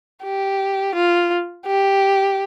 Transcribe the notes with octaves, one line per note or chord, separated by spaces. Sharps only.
G4
F4
G4